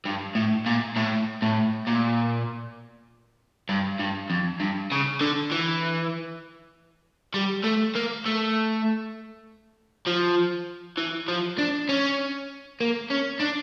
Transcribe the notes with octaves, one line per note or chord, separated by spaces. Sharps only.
G2
A2
A#2
A2
A2
A#2
G2
G2
F2
G2
C#3
D3
E3
G3
A3
A#3
A3
F3
E3
F3
D4
C#4
A#3
C#4
D4